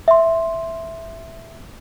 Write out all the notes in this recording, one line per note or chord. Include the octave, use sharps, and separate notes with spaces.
E5 C6